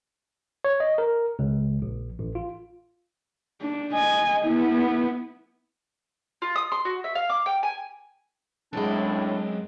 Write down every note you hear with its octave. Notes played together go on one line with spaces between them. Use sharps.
C#5
D#5
A#4
C#2
A#1
A1
F4
D4
D#5 G#5
B3 E4
F4
D#6
C6
F#4
E5
F5
D6
G5
G#5
C2 F#2 A2 G#3 C4 D4